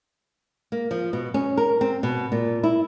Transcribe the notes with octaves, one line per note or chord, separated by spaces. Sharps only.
A#3
F3
B2
C#4
A#4
C4
B2
A#2
E4